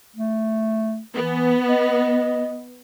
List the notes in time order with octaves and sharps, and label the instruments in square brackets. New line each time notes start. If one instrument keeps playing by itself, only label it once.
[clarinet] A3
[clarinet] E3 [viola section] B3
[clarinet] D#5